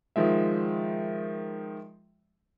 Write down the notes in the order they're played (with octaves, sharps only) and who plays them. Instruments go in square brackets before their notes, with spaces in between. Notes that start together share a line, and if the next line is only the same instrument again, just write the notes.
[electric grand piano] D#3 F3 G#3 E5